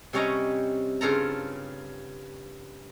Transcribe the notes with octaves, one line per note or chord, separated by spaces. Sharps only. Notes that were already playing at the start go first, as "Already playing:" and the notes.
C3 G3 C#4 C#5 D#5 A#5
G2 C#3 F4 A4 A#5